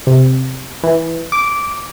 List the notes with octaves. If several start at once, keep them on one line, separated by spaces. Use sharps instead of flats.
C3
E3
D6